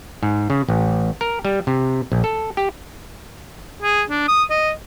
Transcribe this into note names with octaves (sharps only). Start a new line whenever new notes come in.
G#2
C#3
A1
A#4
G3
C3
A#1
A4
G4
G#4
D4
D#6
D#5